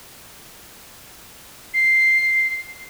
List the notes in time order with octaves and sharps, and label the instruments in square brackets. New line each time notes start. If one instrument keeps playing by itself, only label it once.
[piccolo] C7